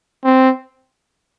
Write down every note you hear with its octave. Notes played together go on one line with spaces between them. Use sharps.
C4